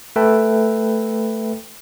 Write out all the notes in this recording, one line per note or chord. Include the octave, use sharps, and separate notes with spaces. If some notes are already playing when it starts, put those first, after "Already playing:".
A3 A4 B4 E5 G5 A5